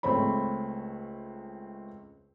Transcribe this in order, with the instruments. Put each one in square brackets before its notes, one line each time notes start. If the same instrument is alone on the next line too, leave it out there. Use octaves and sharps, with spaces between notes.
[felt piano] C#2 A3 C4 C#5 B5